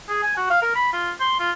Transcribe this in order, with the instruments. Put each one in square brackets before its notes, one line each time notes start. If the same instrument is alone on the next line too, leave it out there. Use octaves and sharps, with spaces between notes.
[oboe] G#4
G#5
F#4
F5
A#4
B5
F4
C6
F4